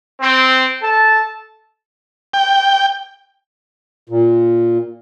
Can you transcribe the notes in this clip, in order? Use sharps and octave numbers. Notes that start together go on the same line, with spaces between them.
C4
A4 A5
G5
A#2